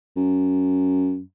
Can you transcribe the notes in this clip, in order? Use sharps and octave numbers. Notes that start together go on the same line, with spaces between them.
F#2